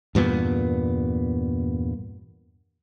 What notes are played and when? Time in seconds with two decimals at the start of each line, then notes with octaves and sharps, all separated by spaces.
0.15 E2 G2 A#2 B3